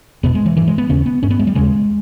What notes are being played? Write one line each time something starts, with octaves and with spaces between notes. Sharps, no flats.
E2 B2 B3
G#3
E3
G2 E3
G#3
B3
D#2 C#3 C#4
B3
G2 C#4
B3
G#3
G3
D#2 C#3 G#3